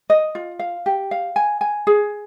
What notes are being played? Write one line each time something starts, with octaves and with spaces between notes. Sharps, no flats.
D#5
F4
F5
G4
F5
G#5
G#5
G#4